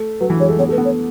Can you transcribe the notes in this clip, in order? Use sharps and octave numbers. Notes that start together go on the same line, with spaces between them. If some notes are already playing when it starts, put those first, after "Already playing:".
Already playing: A3
F#3 B4
E3
G#3 C#5
A3
B3 C#5
A3
B4
B3
C#5